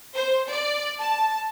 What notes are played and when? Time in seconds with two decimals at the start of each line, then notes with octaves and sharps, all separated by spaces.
0.17 C5
0.51 D5
1.02 A5